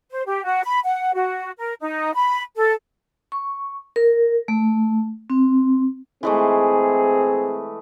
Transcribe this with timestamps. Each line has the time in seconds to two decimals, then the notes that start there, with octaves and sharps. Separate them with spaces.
0.11 C5
0.26 G4
0.43 F#4
0.64 B5
0.84 F#5
1.14 F#4
1.58 A#4
1.80 D#4
2.14 B5
2.56 A4
3.32 C#6
3.96 A#4
4.48 A3
5.30 C4
6.23 E3 G#3 A3 C4 G#4